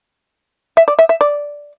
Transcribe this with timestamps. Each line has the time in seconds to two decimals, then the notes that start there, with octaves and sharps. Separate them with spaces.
0.77 E5
0.88 D5
0.99 E5
1.09 E5
1.21 D5